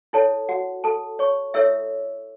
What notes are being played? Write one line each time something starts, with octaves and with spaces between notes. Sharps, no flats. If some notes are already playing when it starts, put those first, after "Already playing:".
E4 A4 C#5 A5
F#4 F#5
A4 A5
C#5 C#6
E4 A4 C#5 E5 E6